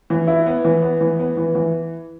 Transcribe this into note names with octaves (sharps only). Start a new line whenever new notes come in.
E3
E4
B3
E3
B3
E3
B3
E3
E3